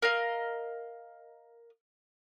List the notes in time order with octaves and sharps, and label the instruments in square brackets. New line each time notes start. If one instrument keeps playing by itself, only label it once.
[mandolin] A#4 D#5 F5